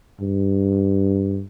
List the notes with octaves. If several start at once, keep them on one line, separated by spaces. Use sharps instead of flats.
G2